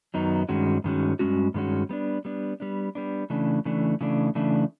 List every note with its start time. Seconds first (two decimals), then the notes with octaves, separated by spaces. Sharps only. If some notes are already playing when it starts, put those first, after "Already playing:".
0.14 F#2 D#3 F#3 B3 D#4
0.49 G2 D#3 G#3 C#4 F#4
0.84 G2 D#3 G#3 C#4 F#4
1.19 G2 D#3 G#3 C#4 F#4
1.54 G2 D#3 G#3 C#4 F#4
1.89 G3 B3 D4
2.25 G3 B3 D4
2.60 G3 B3 D4
2.95 G3 B3 D4
3.30 C#3 E3 A3 D4
3.65 C#3 E3 A3 D4
4.01 C#3 E3 A3 D4
4.35 C#3 E3 A3 D4